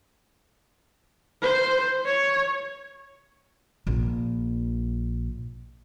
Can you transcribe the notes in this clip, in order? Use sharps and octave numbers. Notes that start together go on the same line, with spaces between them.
C5
C#5
A#1 A#2